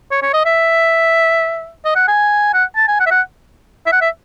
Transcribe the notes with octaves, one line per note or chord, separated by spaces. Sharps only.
C#5
C#5
D#5
E5
D#5
F#5
G#5
F#5
A5
G#5
F#5
E5
F#5
E5
F#5
E5